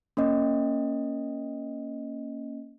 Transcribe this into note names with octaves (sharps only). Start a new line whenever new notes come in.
A#3 C#4 D#5